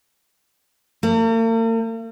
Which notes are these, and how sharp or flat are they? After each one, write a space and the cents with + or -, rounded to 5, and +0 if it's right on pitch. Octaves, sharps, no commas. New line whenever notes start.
A#3 -45